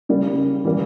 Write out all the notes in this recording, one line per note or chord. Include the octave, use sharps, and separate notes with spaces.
C#3 G3 A#3
E3 G3 A#3